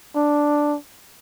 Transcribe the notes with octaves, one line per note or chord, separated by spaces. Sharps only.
D4